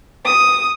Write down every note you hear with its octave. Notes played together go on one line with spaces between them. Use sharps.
D#6